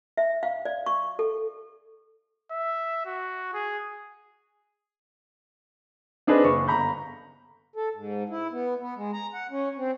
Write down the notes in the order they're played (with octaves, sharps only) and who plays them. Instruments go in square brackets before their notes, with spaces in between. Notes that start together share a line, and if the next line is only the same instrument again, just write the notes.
[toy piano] E5
F5
D5
C#6
A4
[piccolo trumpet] E5
F#4
G#4
[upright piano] C4 D4 G#4 B4 D#5
F#1 C#6
G1 A#5 B5 G6
[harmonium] A4
G#2
E4
B3
B3
G#3
A#5
F#5
C#4
C4